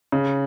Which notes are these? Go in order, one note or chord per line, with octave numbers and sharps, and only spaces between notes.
C#3